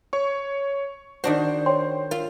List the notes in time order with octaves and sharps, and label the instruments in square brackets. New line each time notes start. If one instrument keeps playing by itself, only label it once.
[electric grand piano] C#5 C#6
[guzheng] D#3 D4 F#4 [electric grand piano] C5
[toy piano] C#5 G5 C6
[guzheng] F4 [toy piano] A#4